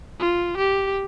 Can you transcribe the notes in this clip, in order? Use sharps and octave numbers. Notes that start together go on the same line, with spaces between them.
F4
G4